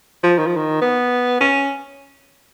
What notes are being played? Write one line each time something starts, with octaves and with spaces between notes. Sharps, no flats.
F3
D#3
F3
D#3
B3
C#4